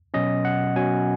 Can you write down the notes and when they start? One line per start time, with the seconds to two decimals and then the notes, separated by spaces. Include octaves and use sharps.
0.14 B2 F#3 C#4 D#5
0.45 F#5
0.76 B2 F#3 C#4 G#5